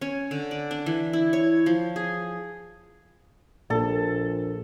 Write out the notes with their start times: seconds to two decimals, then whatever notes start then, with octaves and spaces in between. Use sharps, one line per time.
0.01 C#4
0.31 D3
0.51 D5
0.71 D4
0.86 E3
1.13 E4
1.33 C#5
1.66 F3
1.96 G#4
3.70 A#1 A#2 A4